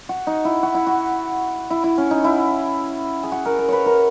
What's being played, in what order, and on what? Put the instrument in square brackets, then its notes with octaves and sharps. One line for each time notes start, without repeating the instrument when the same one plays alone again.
[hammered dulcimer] F#4
D#4
E4
F#4
E4
F#4
E4
E4
C#4
D#4
E4
G#4
F#4
A#4
A#4
B4 C#5
A#4